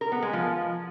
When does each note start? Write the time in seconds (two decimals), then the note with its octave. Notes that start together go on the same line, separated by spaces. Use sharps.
0.01 A#4
0.12 B3
0.23 G#3
0.33 F3